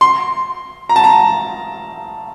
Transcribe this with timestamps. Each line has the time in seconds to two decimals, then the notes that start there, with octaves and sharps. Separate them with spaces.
0.01 C6
0.89 A#5
0.96 A5
1.04 A#5